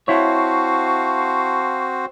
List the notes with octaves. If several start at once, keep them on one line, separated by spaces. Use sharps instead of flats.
C4 E4 F#4 C5 C#5 F5 A5 C#6